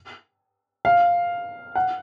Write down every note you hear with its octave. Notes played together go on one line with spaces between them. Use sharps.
F5
F#5